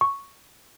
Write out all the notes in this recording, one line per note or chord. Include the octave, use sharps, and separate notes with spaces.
C#6